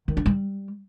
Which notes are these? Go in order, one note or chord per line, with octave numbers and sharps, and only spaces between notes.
D#3
D4
G3